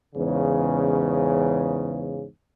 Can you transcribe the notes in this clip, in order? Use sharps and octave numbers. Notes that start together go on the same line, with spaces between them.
E2 G#2 C#3